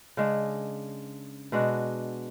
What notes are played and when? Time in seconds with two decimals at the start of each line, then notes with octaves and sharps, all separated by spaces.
0.17 C#3 G#3 D4
1.52 B2 G#3 D4 F#4